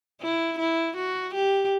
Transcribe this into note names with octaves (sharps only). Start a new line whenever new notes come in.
E4
E4
F#4
G4